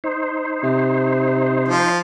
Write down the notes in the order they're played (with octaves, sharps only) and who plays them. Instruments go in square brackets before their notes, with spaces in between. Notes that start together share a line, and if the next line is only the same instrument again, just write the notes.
[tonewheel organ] D#4 C5
[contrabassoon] C3
[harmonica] F3